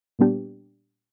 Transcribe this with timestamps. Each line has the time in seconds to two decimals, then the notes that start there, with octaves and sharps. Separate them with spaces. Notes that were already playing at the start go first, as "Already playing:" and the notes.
0.19 A#2 G3 B3 D4 G4